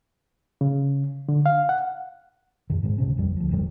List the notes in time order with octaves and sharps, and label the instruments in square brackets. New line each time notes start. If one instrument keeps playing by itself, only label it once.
[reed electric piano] C#3
D3
F5
F#5
[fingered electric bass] F#2 D#3
G#2 D#3 G#3
D2 C3 C#4
A1 F2 G3
D2 F3
E1 F2 D#3 G3